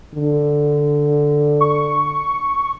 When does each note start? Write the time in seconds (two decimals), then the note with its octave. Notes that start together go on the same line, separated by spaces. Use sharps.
0.14 D3
1.61 C#6